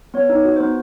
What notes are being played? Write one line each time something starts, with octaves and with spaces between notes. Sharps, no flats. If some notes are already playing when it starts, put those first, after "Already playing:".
B3 C#5
D#4
F#4
B3 C5